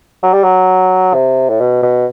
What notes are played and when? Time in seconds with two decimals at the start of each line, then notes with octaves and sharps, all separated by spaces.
0.23 F#3
0.33 G3
0.44 F#3
1.14 C3
1.49 A2
1.60 B2
1.82 B2